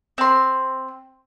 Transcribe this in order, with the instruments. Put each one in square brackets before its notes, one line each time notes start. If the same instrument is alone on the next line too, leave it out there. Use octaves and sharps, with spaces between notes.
[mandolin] C4 C6